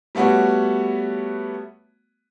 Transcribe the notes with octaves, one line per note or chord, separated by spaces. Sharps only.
G3 A3 B3 F#4 C#5